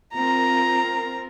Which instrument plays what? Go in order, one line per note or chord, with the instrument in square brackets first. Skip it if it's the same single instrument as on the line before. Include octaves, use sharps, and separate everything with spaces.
[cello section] C4 F4 A#4 [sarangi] A#5